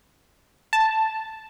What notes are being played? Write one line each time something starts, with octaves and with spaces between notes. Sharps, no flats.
A5